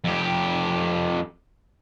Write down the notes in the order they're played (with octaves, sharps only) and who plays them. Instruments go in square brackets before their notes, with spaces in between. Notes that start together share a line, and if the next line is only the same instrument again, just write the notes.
[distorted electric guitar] F2 G4